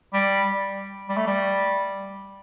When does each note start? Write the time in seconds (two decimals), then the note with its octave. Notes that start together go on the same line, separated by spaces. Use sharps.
0.13 G3
1.09 G3
1.17 A3
1.27 G3